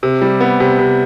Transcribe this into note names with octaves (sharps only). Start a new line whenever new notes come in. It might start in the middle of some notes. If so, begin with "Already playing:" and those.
C3
G3
B3
C3
C3